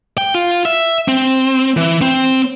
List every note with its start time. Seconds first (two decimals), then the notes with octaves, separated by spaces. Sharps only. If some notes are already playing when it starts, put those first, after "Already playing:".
0.18 G5
0.34 F4
0.65 E5
1.08 C4
1.77 E3
2.02 C4